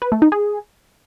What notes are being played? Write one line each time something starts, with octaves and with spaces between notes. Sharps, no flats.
B4
A3
D#4
G#4